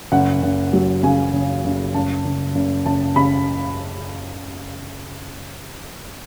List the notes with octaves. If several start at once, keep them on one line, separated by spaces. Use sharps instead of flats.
F#1 F#5
F#1
F#3
C#3 G#5
F#1
F#1
F#1 A5
F#1
F#1
F#1 A5
C#3 B5